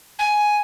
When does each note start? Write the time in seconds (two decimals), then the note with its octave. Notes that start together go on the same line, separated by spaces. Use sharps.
0.18 G#5